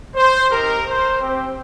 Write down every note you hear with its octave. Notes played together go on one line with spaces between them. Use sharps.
C5
C4 D#4 G4 A#4
C5
C4 G4